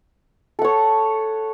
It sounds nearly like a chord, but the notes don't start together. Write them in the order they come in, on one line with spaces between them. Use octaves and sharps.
A4 F#5 C#5